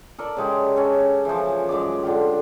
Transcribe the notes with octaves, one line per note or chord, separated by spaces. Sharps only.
A4 A#4 D5
C#3 G#3 G4
C#4 A4
E3 F3
F#2 G#3 D5 D6
D3 F4 G4